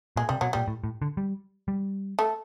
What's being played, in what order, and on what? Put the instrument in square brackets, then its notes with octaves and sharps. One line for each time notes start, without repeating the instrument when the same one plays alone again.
[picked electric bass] A#2 [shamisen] G#3
[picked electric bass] C3 [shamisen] G3
[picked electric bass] B2 [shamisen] F#3
[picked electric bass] A#2 [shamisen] G3
[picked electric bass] A2
A2
D3
G3
G3
[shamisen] A3